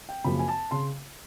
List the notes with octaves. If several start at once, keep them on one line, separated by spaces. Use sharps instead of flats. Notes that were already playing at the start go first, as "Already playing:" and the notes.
G5
F#2 C#3 F3 A#3 B5
G#5
A5
C#3 C6